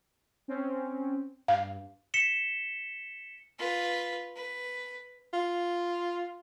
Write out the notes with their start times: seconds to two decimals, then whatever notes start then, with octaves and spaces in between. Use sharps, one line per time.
0.48 C4 C#4
1.48 G2 F5
2.14 B6 C#7 E7 G7
3.59 F4 B4
4.35 B4
5.33 F4